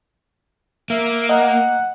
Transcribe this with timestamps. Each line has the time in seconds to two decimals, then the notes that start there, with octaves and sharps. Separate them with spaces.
0.90 A#3 E5
1.29 D#5 F#5 A#5